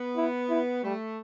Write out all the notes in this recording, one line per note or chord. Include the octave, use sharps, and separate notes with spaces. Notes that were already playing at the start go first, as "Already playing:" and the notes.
Already playing: B3
E4
E4
G3 A3